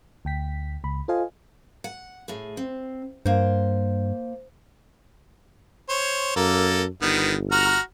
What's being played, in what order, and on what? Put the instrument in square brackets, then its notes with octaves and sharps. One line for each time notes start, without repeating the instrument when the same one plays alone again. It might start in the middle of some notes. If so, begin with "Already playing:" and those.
[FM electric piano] D2 G5 B6
C#2 B5
F4 A4 C5 D#5 F5 G#5
[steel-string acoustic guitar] F#5
A2 G#4
C4
[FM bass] G2 [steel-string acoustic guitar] A#3 C5
[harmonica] C5 C#5
[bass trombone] F#2 [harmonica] A#3 A4
[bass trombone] G1 [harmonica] D#3 G3 B3
[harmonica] F#4 A#5 F6